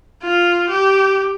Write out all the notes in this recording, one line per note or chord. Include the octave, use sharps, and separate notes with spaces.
F4
G4